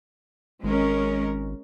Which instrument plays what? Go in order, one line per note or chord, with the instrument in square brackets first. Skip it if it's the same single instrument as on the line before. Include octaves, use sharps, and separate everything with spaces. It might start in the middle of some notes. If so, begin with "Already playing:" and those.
[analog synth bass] G#1 [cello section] G#3 C#4 A#4